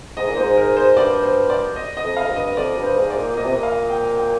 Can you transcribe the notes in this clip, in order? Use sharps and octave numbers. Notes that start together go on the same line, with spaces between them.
G#2 D#5
A#2
G#2 C5
A#4
C5
G2 D5
C5
D5
D#5
D#5
F2
F5
F2
G2
D#5
F2 D5
G2
C5
G#2
D5
A#2
A#2 D#5
C3
A#2
F5
G5
G5